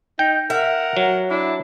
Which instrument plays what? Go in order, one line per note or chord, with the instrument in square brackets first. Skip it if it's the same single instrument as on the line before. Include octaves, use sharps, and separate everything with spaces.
[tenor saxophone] D#4 [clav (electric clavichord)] G5
[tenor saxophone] A#4 [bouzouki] E5 [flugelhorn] F#5
[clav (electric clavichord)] F#3
[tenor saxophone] D4 [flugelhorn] E4